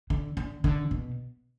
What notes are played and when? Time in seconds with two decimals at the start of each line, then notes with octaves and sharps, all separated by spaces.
0.10 D3
0.37 D3
0.64 D3
0.91 B2